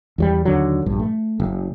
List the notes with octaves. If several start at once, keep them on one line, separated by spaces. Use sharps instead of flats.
E2 F#3 G3
D#2 D3 F#3
A#1 G2
A3
F#1